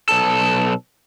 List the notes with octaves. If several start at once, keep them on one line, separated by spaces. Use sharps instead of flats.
B1 A4